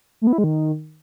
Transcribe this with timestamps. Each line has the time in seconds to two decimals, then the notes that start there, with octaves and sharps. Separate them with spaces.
0.22 A3
0.27 B3
0.33 E4
0.38 G#3
0.44 D#3